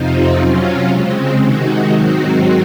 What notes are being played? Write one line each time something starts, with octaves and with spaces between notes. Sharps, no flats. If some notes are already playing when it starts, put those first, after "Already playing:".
Already playing: F2 C3 F3 C4 D#4
C3 F#3 C#4 F4
C#3 G#3 C4
C3 D#3 G#3 D#4 F#4
G#2 D#3 F#3 C4 F#4